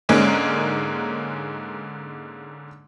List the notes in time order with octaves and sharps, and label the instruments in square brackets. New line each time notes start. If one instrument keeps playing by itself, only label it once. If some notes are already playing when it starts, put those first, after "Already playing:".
[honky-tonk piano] G#2 D3 G#3 A#3 C#4 D#4